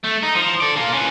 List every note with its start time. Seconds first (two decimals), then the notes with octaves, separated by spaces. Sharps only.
0.04 A3
0.23 D#4
0.35 F3
0.61 A4 D5
0.76 A#3 F4
0.94 C#4 B4